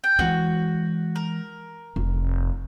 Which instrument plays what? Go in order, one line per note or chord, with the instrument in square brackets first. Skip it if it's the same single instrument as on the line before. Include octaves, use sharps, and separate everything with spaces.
[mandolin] G5
[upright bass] E3 G#3 [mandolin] F#4
[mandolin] A#4
[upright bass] F1